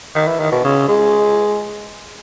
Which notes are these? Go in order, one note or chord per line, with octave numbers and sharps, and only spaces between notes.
D#3
E3
D#3
B2
C#3
G#3